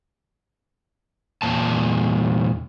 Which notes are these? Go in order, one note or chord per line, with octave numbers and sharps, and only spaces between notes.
E2 A#2 A5